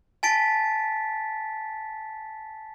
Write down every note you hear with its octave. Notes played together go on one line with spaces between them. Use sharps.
G#5 A5 A6 B6 D7